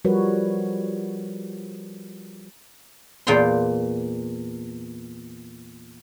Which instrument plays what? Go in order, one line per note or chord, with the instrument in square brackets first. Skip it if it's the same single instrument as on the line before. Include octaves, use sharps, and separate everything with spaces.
[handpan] F3 G3 F#4 A#4 B4 C#5
[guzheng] E2 A#2 G5 A#5 C6